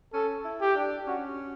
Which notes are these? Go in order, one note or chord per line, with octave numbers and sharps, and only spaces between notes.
C#4 A4
E4
G4
D4
C#4 F#4